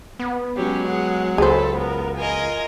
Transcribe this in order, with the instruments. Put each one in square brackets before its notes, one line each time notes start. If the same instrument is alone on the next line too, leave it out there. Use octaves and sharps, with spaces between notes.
[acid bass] B3
[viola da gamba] F#3 G#3 [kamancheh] C#4 G4
[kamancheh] G#4 F#5
[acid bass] C#2 [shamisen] G#4 C5 [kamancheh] A4 B5
[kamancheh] B3 A#4
[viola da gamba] F4 A#4 D#5 [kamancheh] G#5